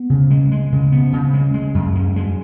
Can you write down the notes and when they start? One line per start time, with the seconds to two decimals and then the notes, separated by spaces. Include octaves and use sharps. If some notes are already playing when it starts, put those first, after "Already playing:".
Already playing: B3
0.10 C#3
0.30 G#3
0.52 G#3
0.72 C#3
0.92 B3
1.13 C#3
1.33 G#3
1.54 G#3
1.74 F#2
1.96 G#3
2.16 G#3